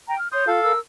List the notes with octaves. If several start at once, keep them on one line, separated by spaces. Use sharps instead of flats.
G5 A#5
F6
C#5 C6 D#6 G6
F4 A4 F5
A#4 E6